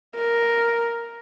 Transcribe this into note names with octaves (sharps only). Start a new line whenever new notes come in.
A#4